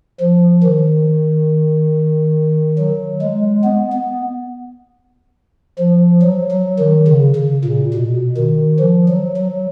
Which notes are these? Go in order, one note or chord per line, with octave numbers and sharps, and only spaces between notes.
F3
D#3
F#3
G#3
B3
B3
F3
F#3
F#3
D#3
C#3
C#3
A#2
B2
D#3
F3
F#3
F#3